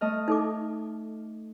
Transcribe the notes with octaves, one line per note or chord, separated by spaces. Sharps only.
A3 D#5 F6
D#4 A4 D6